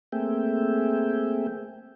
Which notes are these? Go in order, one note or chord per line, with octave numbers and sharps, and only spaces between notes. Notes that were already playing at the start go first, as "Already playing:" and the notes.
A3 A#3 C4 G#4 E5 G5